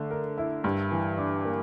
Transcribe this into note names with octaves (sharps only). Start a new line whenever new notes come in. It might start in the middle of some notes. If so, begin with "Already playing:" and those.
Already playing: D3 A3
A#4
E4
G2
E3
D4
A#3